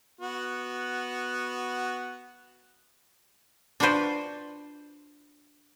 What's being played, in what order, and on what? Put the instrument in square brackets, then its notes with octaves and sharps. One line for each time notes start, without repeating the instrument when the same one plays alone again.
[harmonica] B3 F#4
[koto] D4 F4 F#4 B4 C5 D5